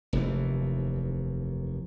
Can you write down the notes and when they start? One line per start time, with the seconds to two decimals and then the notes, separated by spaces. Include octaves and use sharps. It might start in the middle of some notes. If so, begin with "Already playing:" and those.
0.13 F1 D#2 E3